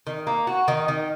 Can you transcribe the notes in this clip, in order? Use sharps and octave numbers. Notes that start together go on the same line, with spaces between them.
D#3
A#3
F#4
D#3
D#3